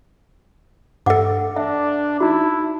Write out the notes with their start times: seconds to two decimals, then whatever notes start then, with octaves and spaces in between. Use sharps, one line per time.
1.06 G2 A4 E5 F#5 D6
1.57 D4 E5
2.20 D#4 E4 F#4